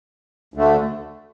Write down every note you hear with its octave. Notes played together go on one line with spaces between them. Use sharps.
D2 D3 A3